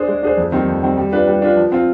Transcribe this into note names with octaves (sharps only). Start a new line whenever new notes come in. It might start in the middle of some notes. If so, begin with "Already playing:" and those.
Already playing: D4 G#4 C5
G#3
D4 G#4 C5
F2
D#3 G3 C4
F2
D#3 G3 C4
G3
D4 F4 B4
G3
D4 F4 B4
F3
C4 F4